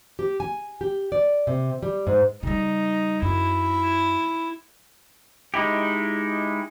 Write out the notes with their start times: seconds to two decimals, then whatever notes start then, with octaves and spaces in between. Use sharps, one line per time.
0.19 G4
0.40 G#5
0.81 G4
1.12 D5
1.47 C3
1.83 G3
2.07 G#2
2.43 C#3 G3 D#4
3.22 F#2 E4
5.54 G#3 D#4 E4 G4